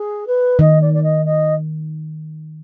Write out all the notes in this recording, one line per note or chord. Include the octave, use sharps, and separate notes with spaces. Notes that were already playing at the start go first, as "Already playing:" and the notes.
Already playing: G#4
B4
D#3 D#5
D5
D5
D#5
D#5